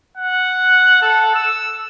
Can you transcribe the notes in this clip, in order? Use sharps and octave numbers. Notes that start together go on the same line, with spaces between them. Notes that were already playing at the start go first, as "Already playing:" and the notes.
F#5
A4
E6